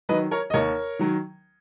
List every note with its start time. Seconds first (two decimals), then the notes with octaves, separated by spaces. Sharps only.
0.09 D#3 F#3 B4 D#5
0.31 A#4 C#5
0.50 D#5
0.54 D#2 A#4 C#5
0.99 D#3 F#3